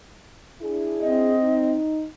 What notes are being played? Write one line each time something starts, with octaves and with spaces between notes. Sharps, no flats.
D4 E4 G#4
C4 D#5
D#4